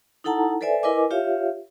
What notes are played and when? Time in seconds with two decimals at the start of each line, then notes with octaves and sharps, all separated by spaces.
0.24 D#4 E4 A4 F#5 A5 A#5
0.61 A4 B4 C5 D5 E5 G#5
0.83 E4 A#4 B4 D#5 G#5 D6
1.11 F4 G4 C#5 E5 F5